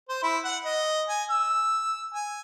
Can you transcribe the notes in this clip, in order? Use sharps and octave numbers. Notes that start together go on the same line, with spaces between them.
C5
E4
F#5
D#5
G#5
E6
G#5